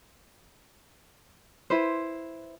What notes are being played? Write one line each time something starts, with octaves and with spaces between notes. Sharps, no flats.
E4 B4 C5